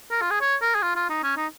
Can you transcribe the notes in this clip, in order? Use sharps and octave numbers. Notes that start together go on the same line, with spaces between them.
A#4
F4
G#4
C#5
A#4
G#4
F4
F4
D#4
C#4
D#4